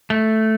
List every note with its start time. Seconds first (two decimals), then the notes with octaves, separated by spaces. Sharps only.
0.10 A3